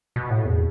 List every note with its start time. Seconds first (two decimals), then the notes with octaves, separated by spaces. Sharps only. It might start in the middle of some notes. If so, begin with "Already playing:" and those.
0.16 B2
0.31 A2
0.45 E2